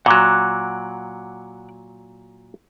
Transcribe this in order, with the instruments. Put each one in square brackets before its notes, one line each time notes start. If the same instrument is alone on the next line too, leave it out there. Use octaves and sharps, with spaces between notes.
[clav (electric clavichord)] A#2 F#3 [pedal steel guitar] F#5 D6 F#6